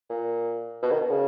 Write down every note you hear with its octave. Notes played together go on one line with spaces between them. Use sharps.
A#2
B2
D#3
B2
C#3